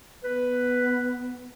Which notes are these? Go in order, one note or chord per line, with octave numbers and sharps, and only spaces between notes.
B3 B4